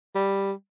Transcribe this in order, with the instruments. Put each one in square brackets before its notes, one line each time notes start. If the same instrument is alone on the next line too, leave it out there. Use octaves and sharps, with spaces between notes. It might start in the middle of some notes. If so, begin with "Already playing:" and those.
[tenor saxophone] G3